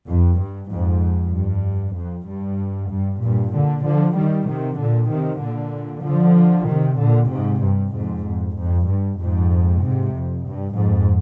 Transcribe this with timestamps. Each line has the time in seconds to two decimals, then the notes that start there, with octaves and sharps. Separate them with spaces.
0.08 F2
0.39 G2
0.71 F2 G#2
1.34 G2
1.96 F2
2.28 G2
2.91 G2
3.22 G2 A#2
3.53 A#2 D3
3.85 D3 F3
4.16 D#3 G3
4.48 C3 D#3
4.79 A#2 D3
5.10 C3 D#3
5.42 A#2 D3
6.05 D3 F3
6.67 C3 D#3
6.98 A#2 D3
7.30 G#2 C3
7.62 G2
7.93 F2 G#2
8.24 F2
8.56 F2
8.87 G2
9.19 F2 G#2
9.81 G#2 C3
10.13 F2
10.44 G2
10.75 F2 G#2